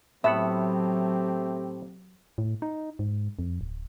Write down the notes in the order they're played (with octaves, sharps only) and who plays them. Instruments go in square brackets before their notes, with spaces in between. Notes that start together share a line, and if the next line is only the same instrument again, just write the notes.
[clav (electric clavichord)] A2 B3 F#5 [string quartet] F#3 [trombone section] A3 C4 G4 [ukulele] E5
[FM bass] A2
D#4
G#2
F2
D1